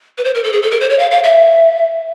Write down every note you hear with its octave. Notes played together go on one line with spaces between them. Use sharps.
B4
C5
A#4
A4
G#4
A4
A#4
C5
C#5
F5
F5
E5